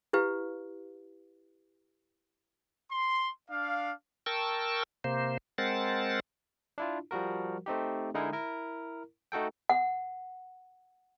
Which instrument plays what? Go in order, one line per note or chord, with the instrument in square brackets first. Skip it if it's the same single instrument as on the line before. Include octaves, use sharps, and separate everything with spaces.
[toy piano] E4 G4 B4 F5
[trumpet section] C6
D4 F5
[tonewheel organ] A#4 G5 A5 C#6 E6
C3 A#3 C5
G#3 C4 A#4 C5 F#5 A6
[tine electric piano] D4 E4 F4
F3 G3 F#4 A#4
A3 C4 D#4 G4
D3 G#3 D#4 E4 G#4 A#4
E4 A#4
A3 D#4 F#4 A4 G5
[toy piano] F#5